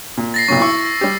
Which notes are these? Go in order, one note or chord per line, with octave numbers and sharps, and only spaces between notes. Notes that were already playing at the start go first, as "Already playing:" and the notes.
A#2
A6 A#6 C7
B1 A#2 F#3 C#6
E4 C#6 E6
G3 G4